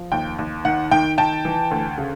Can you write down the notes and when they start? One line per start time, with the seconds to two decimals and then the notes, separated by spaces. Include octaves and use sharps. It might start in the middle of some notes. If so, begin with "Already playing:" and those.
Already playing: F3
0.12 D#2 G5
0.39 D#2
0.65 D#3 F#5
0.91 D#3 G5
1.18 D#3 G5 A5
1.45 E3
1.71 D2
1.98 C#3